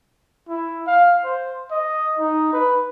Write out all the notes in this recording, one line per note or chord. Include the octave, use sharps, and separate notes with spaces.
E4
F5
C5
D#5
D#4
B4